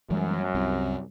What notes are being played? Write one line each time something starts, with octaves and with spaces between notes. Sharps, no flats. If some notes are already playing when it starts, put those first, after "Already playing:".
F#2 E3 G3 G#3
C2 G3 C4